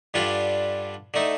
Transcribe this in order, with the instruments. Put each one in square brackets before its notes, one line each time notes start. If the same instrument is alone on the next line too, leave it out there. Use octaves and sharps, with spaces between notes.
[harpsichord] G2 D3 G3 D4 F4
D3 A3 D#4